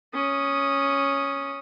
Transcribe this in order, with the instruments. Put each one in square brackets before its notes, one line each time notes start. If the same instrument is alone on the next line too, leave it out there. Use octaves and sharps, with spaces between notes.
[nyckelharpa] C#4 D#6